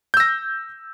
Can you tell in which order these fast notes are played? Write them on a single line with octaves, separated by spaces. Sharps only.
G6 E6 A#6